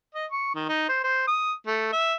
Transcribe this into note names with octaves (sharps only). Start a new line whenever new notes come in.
D#5
C#6
D#3
D#4
C5
C5
D#6
A3
E5